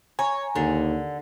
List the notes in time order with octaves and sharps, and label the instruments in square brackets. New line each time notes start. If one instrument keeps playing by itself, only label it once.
[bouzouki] C#5 [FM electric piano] G#5 A#5
[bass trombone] D#2 [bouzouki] D3